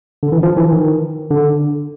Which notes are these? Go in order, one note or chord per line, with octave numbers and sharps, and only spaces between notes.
D3
E3
F3
E3
D#3
D3